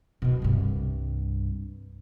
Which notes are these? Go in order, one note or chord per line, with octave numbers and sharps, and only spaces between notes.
B2 D#3
C2 G2